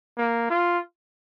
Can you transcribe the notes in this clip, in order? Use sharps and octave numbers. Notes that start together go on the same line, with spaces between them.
A#3
F4